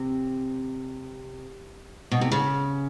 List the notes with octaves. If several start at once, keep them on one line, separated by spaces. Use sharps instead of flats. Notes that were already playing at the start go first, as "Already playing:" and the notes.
Already playing: C3
B2
C3
C#3